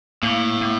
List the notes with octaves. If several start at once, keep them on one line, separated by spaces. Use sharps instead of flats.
A2 A#3
A#3